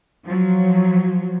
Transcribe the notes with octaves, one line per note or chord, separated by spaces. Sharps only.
F3 F#3